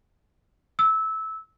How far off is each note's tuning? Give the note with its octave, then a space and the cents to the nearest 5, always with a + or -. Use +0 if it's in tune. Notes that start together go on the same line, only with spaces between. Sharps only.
E6 -20